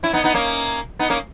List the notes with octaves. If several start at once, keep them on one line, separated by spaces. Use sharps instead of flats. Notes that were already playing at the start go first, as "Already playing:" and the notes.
C#4 E4
B3 D#4
B3 D#4
A#3 C#4
B3 D#4
A#3 C#4